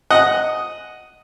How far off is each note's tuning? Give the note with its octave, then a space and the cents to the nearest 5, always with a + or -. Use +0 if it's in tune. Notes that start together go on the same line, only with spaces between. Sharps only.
D#5 +0 F#5 +0